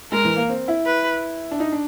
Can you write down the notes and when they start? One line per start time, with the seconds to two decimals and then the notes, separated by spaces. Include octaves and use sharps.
0.12 G#3 A#4
0.24 E3
0.36 A#3
0.49 C4
0.68 E4
0.86 B4
1.51 D4
1.60 D#4
1.72 D4